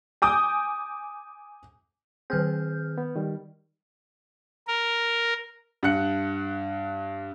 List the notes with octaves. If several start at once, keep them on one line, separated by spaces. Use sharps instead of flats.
G#5 D6 D#6 G6
D#3 C4 G#4 F6 G6
B3
D#3 G3
A#4
G2 F#5 F#6 C#7